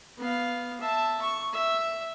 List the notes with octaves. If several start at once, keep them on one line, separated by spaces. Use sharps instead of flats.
B3 F5
E5 A5
C#6
E5